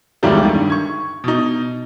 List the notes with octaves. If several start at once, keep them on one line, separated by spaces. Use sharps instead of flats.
C#2 G#2 D#3 F#3 G3 A3
G2 D3 D#3
C#6 G#6
B2 D#4